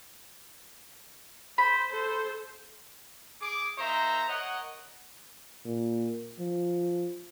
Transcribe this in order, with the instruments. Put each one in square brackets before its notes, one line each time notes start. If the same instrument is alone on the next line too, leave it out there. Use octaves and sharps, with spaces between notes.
[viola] C5 [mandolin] B5
[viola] A4 C5
[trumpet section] G#4 D6
A#3 D#4 C5 E5 A#5
A#4 C#5 D#5 F#5
[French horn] A#2
F3